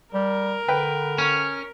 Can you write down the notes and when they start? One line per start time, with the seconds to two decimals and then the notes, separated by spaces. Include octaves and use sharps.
0.14 G3 A#4
0.68 D3 B4 G5
1.18 C#4